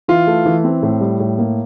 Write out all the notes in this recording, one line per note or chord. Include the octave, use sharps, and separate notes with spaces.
E3 F4
A3
E3
C4
A2
G3
A2
A#3